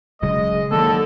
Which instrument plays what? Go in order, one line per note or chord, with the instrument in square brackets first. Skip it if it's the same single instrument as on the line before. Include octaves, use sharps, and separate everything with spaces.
[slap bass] D1 C#3 F#3 [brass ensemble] G#3 D#5
[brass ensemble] D#2 D3 [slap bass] D#3 F#3 A#3 [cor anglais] A4